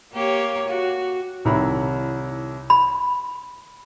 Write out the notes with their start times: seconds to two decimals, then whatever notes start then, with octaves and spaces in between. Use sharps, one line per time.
0.13 A#3 G4 C#5
0.68 F#4
1.45 C2 D#3 E4 C#5 A#5 B5
2.70 B5